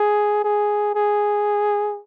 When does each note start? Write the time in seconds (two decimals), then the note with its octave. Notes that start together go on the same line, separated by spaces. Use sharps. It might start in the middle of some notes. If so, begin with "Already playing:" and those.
Already playing: G#4
0.44 G#4
0.95 G#4